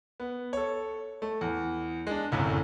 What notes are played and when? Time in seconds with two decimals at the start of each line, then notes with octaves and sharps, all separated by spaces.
0.20 B3
0.53 A4 C#5
1.22 A3
1.41 E2
2.07 G#3 D4
2.31 G1 C2 F#2 A2 C3